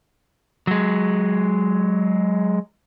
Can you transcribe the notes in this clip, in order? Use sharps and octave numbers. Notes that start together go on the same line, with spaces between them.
F#3 G#3